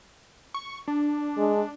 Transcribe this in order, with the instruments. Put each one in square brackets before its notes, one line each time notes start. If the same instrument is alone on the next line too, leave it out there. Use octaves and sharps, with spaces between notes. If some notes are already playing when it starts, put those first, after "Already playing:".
[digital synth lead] C#6
D4
[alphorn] G#3